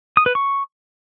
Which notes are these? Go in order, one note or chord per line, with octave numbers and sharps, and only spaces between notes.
D#6
B4
C#6